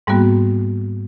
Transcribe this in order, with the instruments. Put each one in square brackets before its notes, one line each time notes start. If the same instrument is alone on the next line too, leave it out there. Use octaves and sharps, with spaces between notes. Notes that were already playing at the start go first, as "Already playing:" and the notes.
[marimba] G#2 G3 A#3 B3 F#4